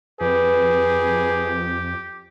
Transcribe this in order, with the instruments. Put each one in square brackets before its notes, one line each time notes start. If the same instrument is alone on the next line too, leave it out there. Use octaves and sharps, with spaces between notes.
[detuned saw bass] F2 [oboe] G4 [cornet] G#4 [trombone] B4